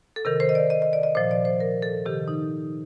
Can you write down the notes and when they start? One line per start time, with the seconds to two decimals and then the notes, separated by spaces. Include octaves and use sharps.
0.16 A4
0.25 C3 D#3 A#4
0.40 C5
0.49 D#5
0.55 D5
0.70 D#5
0.82 D#5
0.93 D5
1.03 D#5
1.15 A#2 F3 C5
1.31 D5
1.45 C5
1.60 A#4
1.82 A4
2.05 C3 D#3 G4
2.28 D#4